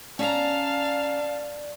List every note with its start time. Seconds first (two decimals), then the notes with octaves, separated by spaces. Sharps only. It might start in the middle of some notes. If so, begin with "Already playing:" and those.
0.19 C#4 D5 F5 A5 A#5